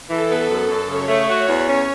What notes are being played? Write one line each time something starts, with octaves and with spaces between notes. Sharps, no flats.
E3 A4
B3
F#2
F#2
C#3 C#5
A3
F#4
E2
C#4